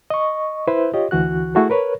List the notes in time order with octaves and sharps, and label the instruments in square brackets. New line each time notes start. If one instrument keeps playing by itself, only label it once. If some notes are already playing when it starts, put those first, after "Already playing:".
[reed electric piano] D#5 C#6
E4 B4 C5 E5
F4 G4 C#5 D#5
D2 E3 F#4 F#6
A3 E4 F#4 G#4 A4
A#4 B4 C#5